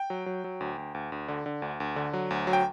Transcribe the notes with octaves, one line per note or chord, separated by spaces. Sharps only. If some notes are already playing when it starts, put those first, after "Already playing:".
Already playing: G5
F#3
F#3
F#3
D2
D2
D2
D2
D3
D3
D2
D2
D3
F#3
D2
F#3
G5